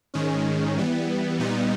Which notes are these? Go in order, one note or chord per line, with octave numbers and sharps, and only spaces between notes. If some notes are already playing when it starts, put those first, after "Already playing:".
G#2 D#3 G#3 C#4
E3 G3 B3
A#2 G3 B3 D#4